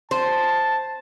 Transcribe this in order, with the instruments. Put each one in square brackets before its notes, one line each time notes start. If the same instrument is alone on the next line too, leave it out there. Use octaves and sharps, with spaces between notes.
[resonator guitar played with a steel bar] C5 [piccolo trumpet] A5